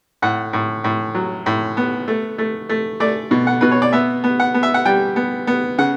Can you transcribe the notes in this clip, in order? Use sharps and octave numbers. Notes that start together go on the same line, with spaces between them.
A2 F#5
A2
A2
F#3
A2
B3
A3
A3
A3
A3 D5
B2
F#5
B2 B4
C#5
D5
B3 E5
B3
F#5
B3
E5
F#5
G3 G5
B3
B3
C#3 F#5